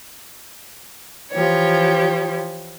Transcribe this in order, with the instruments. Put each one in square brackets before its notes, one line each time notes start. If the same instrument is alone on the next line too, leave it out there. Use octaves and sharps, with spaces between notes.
[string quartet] E3 F3 G4 C#5